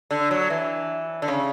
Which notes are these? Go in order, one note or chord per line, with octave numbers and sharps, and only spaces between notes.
D3
F#3
E3
D3
C#3